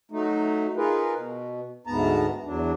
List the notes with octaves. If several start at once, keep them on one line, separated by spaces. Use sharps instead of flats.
F#3 A3 D#4
D#4 F4 G#4 A#4 B4
B2
D2 G#2 B3 A5 A#5
E2 F#3 D4